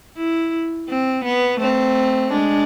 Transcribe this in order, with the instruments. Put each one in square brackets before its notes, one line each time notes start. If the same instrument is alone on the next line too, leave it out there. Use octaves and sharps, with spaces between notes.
[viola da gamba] E4
C4
B3
[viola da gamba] A3 [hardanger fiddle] C4
[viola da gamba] G#3 [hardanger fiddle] D4